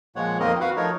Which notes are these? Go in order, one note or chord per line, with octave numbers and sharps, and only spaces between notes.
A#2 F3 G#3 C#5 F#5
F2 D#3 A#3 C4 A#4 D#5
F#4 B4 F5 F#5
F3 A3 D#4 A#4 C#5